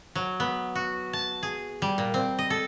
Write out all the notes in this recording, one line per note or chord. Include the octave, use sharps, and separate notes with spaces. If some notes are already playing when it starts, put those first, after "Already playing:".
F#3
B3
F#4
A5
G#4
G3
A#2
C4
D#5
A4